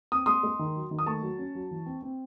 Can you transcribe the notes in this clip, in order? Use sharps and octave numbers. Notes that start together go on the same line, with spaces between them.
C4 D#6
G#3 C6 D#6
G#3
D#3
F#3
D#3
D#6
A3 A5 C#6
F#3
C#4
F#3
E3
C4
C4